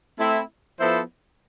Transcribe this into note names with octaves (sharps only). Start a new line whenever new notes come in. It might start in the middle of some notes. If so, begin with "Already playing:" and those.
A3 C4 E4
F3 B3 E4 A4 C5